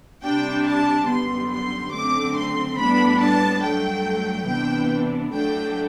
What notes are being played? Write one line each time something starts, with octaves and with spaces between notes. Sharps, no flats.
C3 G3 D4 G5
A5
F#2 D3 G3 B3 C6
C6
F#2 D3 A3 C4 D6
C6
A2 G3 B3 D4 B5
A5
G2 F#3 A3 G5
C3 E3 B3 D4 G5
A2 F#3 A3 D4 G5